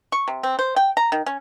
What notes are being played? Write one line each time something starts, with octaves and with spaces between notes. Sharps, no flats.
C#6
C3
C4
C5
G5
A#5
D#3
C#4